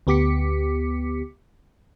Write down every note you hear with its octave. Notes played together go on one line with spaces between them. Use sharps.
D2 B3 G4 D6 B6 C#7